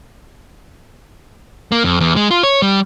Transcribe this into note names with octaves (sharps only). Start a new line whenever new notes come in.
A#3
F2
E2
G#3
F4
C#5
G3